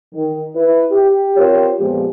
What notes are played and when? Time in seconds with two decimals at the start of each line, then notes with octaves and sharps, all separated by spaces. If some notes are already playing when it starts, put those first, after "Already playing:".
0.13 D#3
0.55 E4 B4
0.91 G4
1.37 C4 F4 G4 A#4 C5 C#5
1.79 F2 A#2 F3 G#3 B3 G4